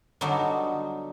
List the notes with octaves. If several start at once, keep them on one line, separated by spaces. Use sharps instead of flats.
D3 F#3 G3 B3 D#4 F#4